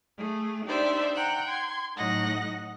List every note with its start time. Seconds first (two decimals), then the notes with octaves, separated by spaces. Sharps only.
0.17 A3 G#4
0.65 D4 D#4 G4 C5 D5 E5
1.15 F#5 G5 A#5 F#6
1.48 C6 G#6
1.96 A2 F#3 D#4 D#5 F#5 A#6